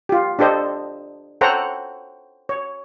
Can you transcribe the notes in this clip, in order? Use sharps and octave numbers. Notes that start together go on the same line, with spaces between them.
F4 G4
D4 G4 A4 C5 D#5
A4 C5 C#5 F#5 G5 A#5
C#5